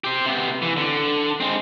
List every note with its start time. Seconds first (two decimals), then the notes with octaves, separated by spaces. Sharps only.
0.04 G4 C5
0.26 C3 B3
0.62 E3
0.77 D3
1.40 G#3 C4